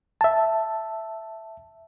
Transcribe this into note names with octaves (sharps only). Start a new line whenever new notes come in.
E5 A5